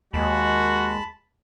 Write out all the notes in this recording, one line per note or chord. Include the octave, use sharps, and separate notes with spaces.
D#2 G#3 F#4 A5 B5